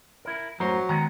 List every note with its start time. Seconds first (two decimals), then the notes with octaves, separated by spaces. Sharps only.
0.25 E4 A#4
0.60 F#2 A2 F#3 C5 A#5
0.89 D#3 G#3 B3 A#5